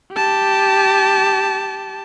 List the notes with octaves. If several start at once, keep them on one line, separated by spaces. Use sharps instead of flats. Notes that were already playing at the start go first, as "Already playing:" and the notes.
G4 A5